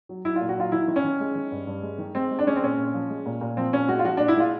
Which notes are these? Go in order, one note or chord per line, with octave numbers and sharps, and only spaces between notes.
F#3
F#3 E4
F4
A#2
F#4
F#3 F4
D#3 E4
D#3
C#4
D#3
G#3
D#3
G2
G2
G#3
D#3
G#3 C4
G#3
D4
G#3 C#4
C4
A#2 C#4
A#2
F3
G#3
A#2
A#2
F3 C4
A#2 C#4
G#3 F#4
F4
F3 F#4
A#2 D4
E4
G#3 F4